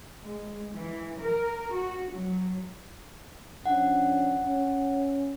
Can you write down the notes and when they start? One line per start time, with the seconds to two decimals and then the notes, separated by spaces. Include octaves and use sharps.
0.21 G#3
0.73 E3
1.20 A#4
1.71 F#4
2.12 F#3
3.66 F3 C#4 D4 F#5
4.45 C#4